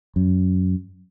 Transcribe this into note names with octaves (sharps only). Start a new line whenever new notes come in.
F#2